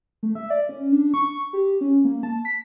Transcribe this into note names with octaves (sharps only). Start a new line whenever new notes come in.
A3
E5
D5
C#4
D4
C#6
G4
C#4
A#3
A5
B6